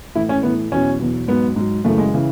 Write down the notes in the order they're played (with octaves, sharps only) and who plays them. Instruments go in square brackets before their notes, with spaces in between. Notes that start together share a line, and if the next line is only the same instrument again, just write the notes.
[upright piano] A2 E3 E4
C#4
A2 E3 B3
E2 B2 F#3 C#4
E2 B2 F#3
G#2 F#3 B3
G#2 F#3
F#2 C#3 E3 A3
G#3
C#3 E3